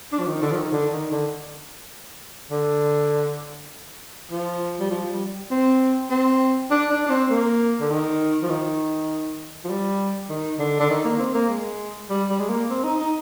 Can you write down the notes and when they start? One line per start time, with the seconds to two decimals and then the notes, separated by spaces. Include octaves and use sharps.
0.13 D4
0.20 F3
0.27 D#3
0.42 D3
0.52 F3
0.57 D#3
0.72 D3
0.93 D#3
1.11 D3
2.51 D3
4.32 F3
4.80 G3
4.91 F3
5.11 G3
5.51 C4
6.10 C4
6.71 D4
6.90 D4
7.06 D4
7.10 C4
7.30 A#3
7.81 D3
7.91 D#3
8.43 F3
8.50 D#3
9.64 F3
9.70 G3
10.29 D#3
10.59 D3
10.80 D3
10.90 D#3
11.05 A#3
11.19 C4
11.34 A#3
11.50 G#3
12.10 G3
12.29 G3
12.39 G#3
12.49 A#3
12.70 C4
12.84 D#4
12.99 D#4